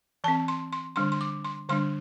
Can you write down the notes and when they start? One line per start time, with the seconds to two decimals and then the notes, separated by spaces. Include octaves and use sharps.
0.24 E3 C4 A5
0.48 C6
0.73 C6
0.96 D3 G3 D4 C6
1.12 C6
1.21 D6
1.45 C6
1.69 D3 G3 D4 C6